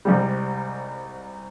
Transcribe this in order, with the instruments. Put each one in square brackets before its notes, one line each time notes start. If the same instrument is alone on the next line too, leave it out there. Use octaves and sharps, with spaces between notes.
[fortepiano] C2 G#2 G3